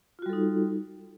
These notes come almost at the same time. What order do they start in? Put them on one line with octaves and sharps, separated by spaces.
F4 F#4 G3 A4 D#4